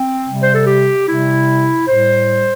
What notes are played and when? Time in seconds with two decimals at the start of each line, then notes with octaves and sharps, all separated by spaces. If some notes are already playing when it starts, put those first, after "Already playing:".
Already playing: C4
0.28 C3 G3
0.41 C5
0.54 A4
0.67 G4
1.07 C3 G3 E4
1.87 A2 G3 C5